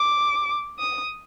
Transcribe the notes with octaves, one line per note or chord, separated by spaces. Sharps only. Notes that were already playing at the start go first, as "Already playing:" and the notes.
Already playing: D6
D#6